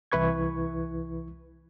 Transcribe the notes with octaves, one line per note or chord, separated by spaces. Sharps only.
C2 E3 E4 B4 C#6 G#6